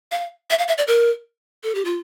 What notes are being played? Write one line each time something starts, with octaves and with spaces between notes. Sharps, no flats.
F5
E5
F5
E5
D5
A#4
A4
G4
F4